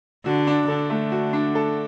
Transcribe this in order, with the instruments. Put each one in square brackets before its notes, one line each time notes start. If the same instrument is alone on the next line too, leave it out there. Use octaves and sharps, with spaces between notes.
[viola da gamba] D3 [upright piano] F#4
[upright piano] D4
[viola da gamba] D3 [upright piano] A4
[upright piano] A3
F#4
D4
A4